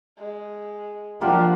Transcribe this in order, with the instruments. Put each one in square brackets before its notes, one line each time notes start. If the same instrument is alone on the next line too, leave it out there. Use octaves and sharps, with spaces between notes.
[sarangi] G#3
[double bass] F3 [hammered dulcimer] A#3 F4 F#5 [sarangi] D4 [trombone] G4